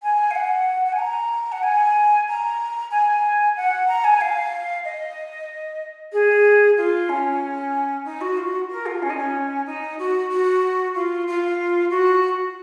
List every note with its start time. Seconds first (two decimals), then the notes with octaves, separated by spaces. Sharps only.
0.02 G#5
0.30 F5
0.35 F#5
0.85 F#5
0.92 G#5
0.98 A#5
1.52 F#5
1.62 G#5
2.28 A#5
2.91 G#5
3.56 F#5
3.88 A#5
4.04 G#5
4.20 F5
4.84 D#5
6.12 G#4
6.77 F4
7.09 C#4
8.05 D#4
8.21 F#4
8.37 F4
8.48 F#4
8.70 A#4
8.85 F4
9.02 C#4
9.09 D#4
9.17 C#4
9.66 D#4
9.98 F#4
10.29 F#4
10.94 F4
11.27 F4
11.90 F#4